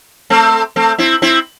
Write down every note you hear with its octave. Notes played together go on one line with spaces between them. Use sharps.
A3 C4
A3 C4
C4 E4
C4 E4